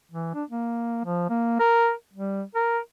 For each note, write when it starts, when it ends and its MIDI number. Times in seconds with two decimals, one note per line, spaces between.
0.12 0.31 52
0.34 0.44 62
0.50 1.03 58
1.05 1.27 53
1.30 1.59 58
1.60 1.92 70
2.13 2.43 55
2.55 2.79 70